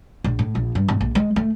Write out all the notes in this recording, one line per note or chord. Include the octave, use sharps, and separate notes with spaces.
A#1
A2
A#1
G2
G#1
A#1
G#3
A3